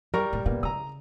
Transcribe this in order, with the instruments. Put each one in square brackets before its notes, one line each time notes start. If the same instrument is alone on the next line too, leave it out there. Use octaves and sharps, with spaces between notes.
[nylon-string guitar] G3 [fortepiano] A#4 A#5 C#6
[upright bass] A2
[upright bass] A#2 [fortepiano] A#3 B3
[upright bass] C#3 [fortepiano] A#5 D#6